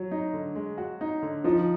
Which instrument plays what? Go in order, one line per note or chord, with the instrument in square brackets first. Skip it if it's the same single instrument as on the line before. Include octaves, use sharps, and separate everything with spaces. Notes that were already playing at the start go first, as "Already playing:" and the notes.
Already playing: [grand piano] F#3
[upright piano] D#4
D3
G#3
F#4
D#4
D3
[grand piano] F3 [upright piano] D#4